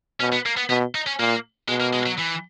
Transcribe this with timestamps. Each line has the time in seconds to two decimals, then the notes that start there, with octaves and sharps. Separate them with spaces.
0.20 B2 C#4
0.33 B3
0.46 A#3
0.57 B3
0.69 B2 B3
0.95 D#4
1.07 C#4
1.19 A#2 A#3
1.68 B2 G#3
1.80 A#3
1.93 G#3
2.06 F#3
2.18 E3